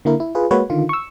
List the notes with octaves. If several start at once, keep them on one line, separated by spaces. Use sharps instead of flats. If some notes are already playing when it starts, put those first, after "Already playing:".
D3 A#3 E4 A#4
E4
F4 G#4 B4
G#3 A#3 F#4 B4 C#5
D3 D#3 F4
C#6 E6